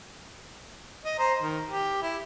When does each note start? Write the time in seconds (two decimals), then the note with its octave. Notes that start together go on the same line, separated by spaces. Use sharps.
1.05 D#5
1.19 C5 A#5
1.41 D#3
1.69 G4
2.02 E4